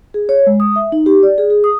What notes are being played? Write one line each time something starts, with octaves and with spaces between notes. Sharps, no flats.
G#4
C#5
G#3
D#6
E5
D#4
G4
D5
G#4
G#4
D#6